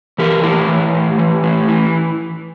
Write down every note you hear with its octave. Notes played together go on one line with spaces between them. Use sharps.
E3 G4 A#4
A2 E4 G4
E3
A2
E3
A2
E3